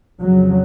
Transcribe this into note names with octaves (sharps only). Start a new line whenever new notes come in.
F2 C#3 F#3